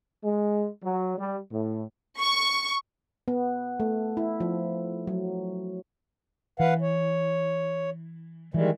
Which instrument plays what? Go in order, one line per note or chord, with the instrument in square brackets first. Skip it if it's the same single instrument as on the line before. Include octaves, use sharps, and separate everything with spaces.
[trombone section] G#3
F#3
G3
A2
[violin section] C#6
[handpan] B3
A3
E4
F3
F#3
[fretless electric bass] E3 [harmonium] B4 F5 F#5
[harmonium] C#5
[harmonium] D#3 G3 G#3 [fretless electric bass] E3